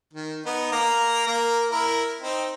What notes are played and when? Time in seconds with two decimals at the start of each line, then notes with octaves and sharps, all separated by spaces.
0.13 D#3
0.46 B3 D#4
0.72 A#3 A#5
1.27 A#3 A#4
1.72 E4 A#4
2.21 C4 D#4